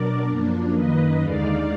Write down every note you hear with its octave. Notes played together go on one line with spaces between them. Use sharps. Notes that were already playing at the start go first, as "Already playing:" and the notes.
Already playing: B2 F#3 D4 A#4 D5
F#2 F3 A#3 D4
F#2 D#3 A#3 B4 D#5
D#2 D3 G#3 D#4 D5 F5